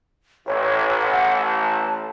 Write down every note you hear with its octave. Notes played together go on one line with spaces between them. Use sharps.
A1 C#5
F#5
A5